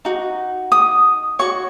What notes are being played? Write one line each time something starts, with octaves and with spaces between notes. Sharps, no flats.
D#4 F#4
D#6
F#4 C#5 C#6